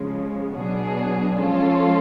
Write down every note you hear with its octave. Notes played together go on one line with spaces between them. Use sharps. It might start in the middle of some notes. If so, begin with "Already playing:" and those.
Already playing: C#3 F3 G#3
B2 F#3 B3 D4 G#4
F3 G#3 C#4 F4 A4